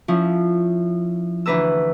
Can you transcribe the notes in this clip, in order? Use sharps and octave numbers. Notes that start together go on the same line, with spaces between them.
F3 C#4 E4
D2 E3 D4 B4 A#5 E6